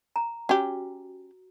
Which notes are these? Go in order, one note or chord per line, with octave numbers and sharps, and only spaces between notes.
A#5
C#4 F#4 G4